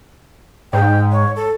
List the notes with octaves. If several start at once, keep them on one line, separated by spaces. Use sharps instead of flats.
G#2 G5
C#5
A4